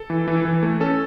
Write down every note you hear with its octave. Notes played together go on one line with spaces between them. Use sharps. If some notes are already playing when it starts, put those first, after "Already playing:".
Already playing: A4
E3
E3
E3
A3
C#4 A4